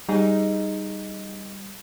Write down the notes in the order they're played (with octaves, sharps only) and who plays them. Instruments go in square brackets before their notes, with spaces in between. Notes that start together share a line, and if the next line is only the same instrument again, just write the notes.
[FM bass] G3 [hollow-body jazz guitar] D#4 G#4